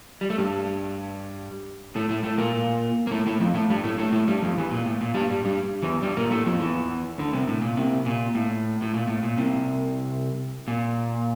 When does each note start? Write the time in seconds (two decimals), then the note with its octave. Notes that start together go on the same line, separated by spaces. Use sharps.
0.21 G3
0.30 A3
0.38 G2 G3
1.96 A2 A3
2.09 A2 A3
2.24 A2 A3
2.38 A#2 A#3
3.07 A#3
3.11 A2 A3
3.27 A2 A3
3.41 F2 F3
3.55 A2 A3
3.70 G2 G3
3.84 A2 A3
3.98 A2 A3
4.13 A2 A3
4.28 G2 G3
4.42 F2 F3
4.57 E2 E3
4.71 A#2
4.86 A2
5.01 A#2
5.15 G2 G3
5.30 G2 G3
5.44 G2 G3
5.82 E2 E3
6.02 G2 G3
6.17 A#2 A#3
6.31 A2 A3
6.46 F2 F3
6.60 E2 E3
7.18 D2 D3
7.33 C2 C3
7.48 A2
7.62 A#2
7.77 C2 C3
8.06 A#2
8.35 A2
8.82 A2
8.94 A#2
9.08 A2
9.23 A#2
9.37 C2 C3
10.68 A#2